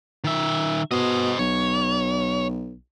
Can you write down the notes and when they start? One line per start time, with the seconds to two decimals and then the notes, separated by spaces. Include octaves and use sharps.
0.24 D#3 E5
0.91 B2 C5 D#5
1.39 B1 C#5